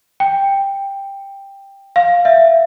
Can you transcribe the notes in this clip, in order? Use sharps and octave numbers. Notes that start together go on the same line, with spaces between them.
G5
F5
E5